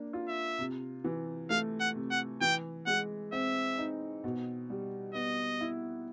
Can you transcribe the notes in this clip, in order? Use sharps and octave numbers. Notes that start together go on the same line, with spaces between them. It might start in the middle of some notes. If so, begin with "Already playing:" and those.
Already playing: A#3 D4
F4
E5
C3
E3
A3 F5
F#5
C3
F#5
E3 G5
G#3 F#5
C4 E5
D#4
B2
G3
B3 D#5
E4